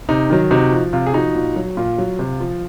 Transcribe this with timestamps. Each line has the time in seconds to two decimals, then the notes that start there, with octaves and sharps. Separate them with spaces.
0.09 C3 D#4
0.30 D#3 F#3
0.51 C3 D#4 F#4
0.72 F3
0.93 C3 F4
1.06 G#4
1.13 F3 D#4 F#4
1.35 A#2
1.56 F#3
1.77 A#2 F4
1.98 F#3
2.19 C3
2.40 F3